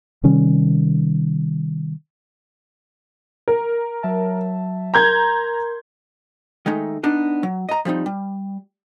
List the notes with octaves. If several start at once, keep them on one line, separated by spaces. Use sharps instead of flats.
C3 D#3 G3 C#4
A#4
F#3 E5 A5
A#4 A#5 C6 G6 G#6
D#3 G#3 A3 D#4
B3 D4 D#4
F#3
D#5 A#5
F3 G3 C4 D#4
G3